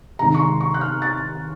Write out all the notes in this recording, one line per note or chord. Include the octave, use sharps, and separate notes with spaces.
C3 D#3 G#3 A#5
C#6
C6
C#6
F#6
F6
A6